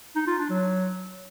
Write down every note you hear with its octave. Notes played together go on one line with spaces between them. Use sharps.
D#4
F4
D4
F#3